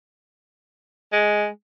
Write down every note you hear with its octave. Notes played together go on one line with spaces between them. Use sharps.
G#3